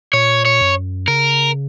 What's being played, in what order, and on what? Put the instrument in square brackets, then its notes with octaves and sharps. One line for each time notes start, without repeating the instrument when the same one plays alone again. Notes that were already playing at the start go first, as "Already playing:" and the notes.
[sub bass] A#2 [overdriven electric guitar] C#5
[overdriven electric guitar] C#5
[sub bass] F#2
[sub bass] C#3 [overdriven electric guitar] A#4